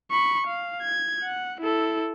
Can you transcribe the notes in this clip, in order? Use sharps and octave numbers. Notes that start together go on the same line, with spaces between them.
B5 C#6
F5
G#6
F#5
E4 A4